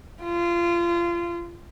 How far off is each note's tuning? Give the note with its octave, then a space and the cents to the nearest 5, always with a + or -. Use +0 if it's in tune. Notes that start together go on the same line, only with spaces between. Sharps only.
F4 -25